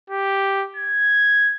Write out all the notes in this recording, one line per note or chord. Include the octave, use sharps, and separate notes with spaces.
G4
G#6